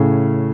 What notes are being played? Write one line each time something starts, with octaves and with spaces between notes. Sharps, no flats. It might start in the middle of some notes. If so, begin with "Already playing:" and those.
Already playing: A2 C#3